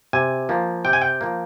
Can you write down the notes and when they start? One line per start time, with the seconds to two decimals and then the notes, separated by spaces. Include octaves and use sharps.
0.13 C3 G#5
0.49 F3 A#3
0.85 C3 G5
0.93 G#5
1.02 G5
1.21 F3 A#3